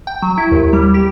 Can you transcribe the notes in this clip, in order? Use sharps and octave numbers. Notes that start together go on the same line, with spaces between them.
G5
F#3
E4
D#2
G3
G4